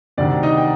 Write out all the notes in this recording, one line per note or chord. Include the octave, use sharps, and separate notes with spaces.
D2 C3 D#3 D4 D5
D#4 D#5
G5